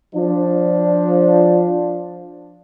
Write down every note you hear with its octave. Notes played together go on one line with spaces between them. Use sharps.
F3 D4